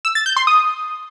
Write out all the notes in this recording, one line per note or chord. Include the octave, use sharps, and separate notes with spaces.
E6
A6
G6
C6
D#6